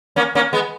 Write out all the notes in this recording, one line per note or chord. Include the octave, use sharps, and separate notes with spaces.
A#3 C#4
A#3 C#4
G#3 B3